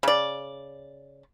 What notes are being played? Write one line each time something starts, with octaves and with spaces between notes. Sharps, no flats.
C#3 D5